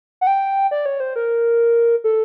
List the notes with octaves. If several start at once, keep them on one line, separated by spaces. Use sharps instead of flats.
F#5
G5
D5
C#5
C5
A#4
A4